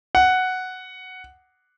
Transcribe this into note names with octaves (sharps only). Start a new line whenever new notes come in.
F#5